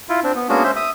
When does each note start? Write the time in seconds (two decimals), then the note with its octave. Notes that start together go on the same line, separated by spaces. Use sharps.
0.09 E4 F4
0.24 C4 D4
0.35 B3
0.49 G#3 A#3 B3 C#4 D4 F#4
0.64 C#4 C5 E5
0.76 E5 D#6